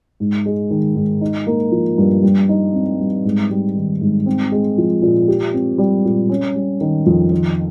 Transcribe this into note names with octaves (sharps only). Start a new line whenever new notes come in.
G#2
G#3
D#3
G#2
D#4
A#3
F3
G2
G3
D#4
C4
G3
G#2
G3
D#3
G#2
C4
G#3
F3
A#2
G4
C4
G3
A#2
C#4
G3
D#3
F2
D#3